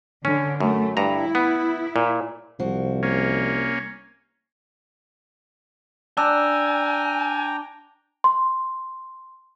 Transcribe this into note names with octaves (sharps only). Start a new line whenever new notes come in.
D3 C#4
F#2 A3
G2 E4 A#5
B3
A#2
C2 F3 F#4
A#3 C#4
D4 G5 G#5 A#5 E6
C6